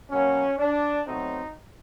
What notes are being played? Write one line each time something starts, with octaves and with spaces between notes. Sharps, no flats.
B2 F#3 A#3 C#4
D4
B2 F#3 A3 C4 D#4